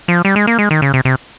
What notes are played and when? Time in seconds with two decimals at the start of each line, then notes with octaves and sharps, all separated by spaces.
0.08 F3
0.25 G3
0.36 G#3
0.47 A#3
0.59 G#3
0.71 D#3
0.82 C#3
0.94 C3
1.05 C3